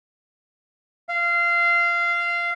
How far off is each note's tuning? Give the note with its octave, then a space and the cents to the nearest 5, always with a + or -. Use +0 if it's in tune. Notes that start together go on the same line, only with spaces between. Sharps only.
F5 -20